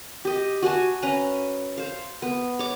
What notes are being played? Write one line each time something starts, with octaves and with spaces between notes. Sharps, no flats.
G4 D#5
F#4 F#5 G#5 A5
C#4 B4 A#5
C5 F5
B3
C#5 D6